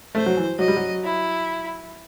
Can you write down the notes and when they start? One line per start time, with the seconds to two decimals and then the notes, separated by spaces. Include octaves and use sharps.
0.15 A3 C5
0.26 F#3
0.37 E3
0.59 F#3 D#5
0.68 G3
0.76 F#3
1.04 E4